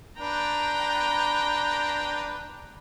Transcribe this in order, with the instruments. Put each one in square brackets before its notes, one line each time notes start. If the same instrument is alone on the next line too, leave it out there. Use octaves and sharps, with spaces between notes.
[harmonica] D4 B4 [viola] G5 A#5